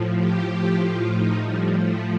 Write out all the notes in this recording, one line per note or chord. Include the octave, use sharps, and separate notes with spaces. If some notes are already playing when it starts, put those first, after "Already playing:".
Already playing: A2 F3
G4
A2 F3 G4
F4
D#4
G3
A2 F3 A3